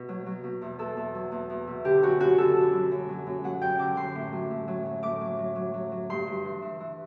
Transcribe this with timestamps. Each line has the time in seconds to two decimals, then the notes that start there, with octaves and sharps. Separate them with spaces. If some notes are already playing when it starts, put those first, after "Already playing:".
Already playing: B2
0.09 F#3
0.26 F#3
0.44 B2
0.61 E2
0.79 E2 A4
0.97 E2
1.15 F#3
1.32 E2
1.50 E2
1.67 B2
1.85 D3 G4
2.03 F#2 F#4
2.20 F#2 F#4
2.38 D3 A4
2.56 D3
2.73 F#3
2.91 F#2
3.09 F#3
3.27 F#2
3.44 F#3 F#5
3.61 F#2 G5
3.79 D3 D6
3.97 F#3 C6
4.15 A2
4.33 F#3
4.51 A2
4.68 F#3
4.86 F#3
5.03 A2 D6
5.21 F#3
5.39 F#3
5.56 F#3
5.74 F#3
5.92 F#3
6.10 G2 C6
6.27 G2
6.45 E3
6.62 E3
6.80 E3